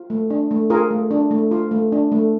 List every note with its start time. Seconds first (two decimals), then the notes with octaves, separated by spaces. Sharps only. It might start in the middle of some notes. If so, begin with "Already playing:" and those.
Already playing: F4
0.10 A3
0.30 D4
0.51 A3
0.70 F4 G#4 A#4
0.90 A3
1.11 D4
1.31 A3
1.51 F4
1.71 A3
1.92 D4
2.12 A3